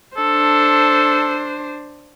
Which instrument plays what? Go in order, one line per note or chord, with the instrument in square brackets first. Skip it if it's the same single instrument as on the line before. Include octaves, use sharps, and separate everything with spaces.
[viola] D4 C5 [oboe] A4